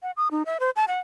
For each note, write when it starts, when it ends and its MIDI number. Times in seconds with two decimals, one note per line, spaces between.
0.03 0.11 78
0.17 0.28 87
0.31 0.43 63
0.46 0.58 76
0.60 0.70 72
0.76 0.85 81
0.88 0.99 78